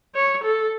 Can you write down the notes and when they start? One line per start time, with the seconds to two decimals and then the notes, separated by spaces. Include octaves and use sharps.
0.15 C#5
0.44 A4